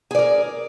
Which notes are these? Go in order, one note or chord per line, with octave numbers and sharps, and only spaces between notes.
G#4 A#4 D5